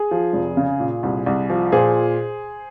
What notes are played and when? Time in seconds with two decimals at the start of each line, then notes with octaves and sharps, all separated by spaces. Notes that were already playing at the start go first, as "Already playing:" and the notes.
Already playing: G#4
0.11 F3
0.33 F1
0.57 C#3
0.80 A#2
1.03 C2
1.26 C2
1.50 F3
1.72 A#2 G#4 C5